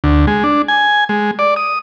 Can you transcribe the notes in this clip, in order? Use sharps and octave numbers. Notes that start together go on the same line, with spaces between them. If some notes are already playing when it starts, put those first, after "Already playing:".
D2
G#3
D4
G#5
G#3
D5
D#6